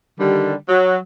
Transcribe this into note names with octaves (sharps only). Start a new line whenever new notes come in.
D3 D#3 G3
F#3